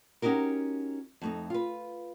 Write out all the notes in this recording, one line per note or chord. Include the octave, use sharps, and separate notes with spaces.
C#4 D#4 F#4 G4 A#4
F2 A3 D#4
F4 B4